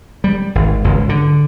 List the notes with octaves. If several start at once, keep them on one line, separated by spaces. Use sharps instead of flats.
G3
G#1
G#1 C#2 G#2
D3